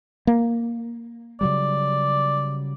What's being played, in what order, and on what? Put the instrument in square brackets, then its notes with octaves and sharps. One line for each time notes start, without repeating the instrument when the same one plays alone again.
[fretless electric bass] A#3
[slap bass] C#3 F#3 G3 [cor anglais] D5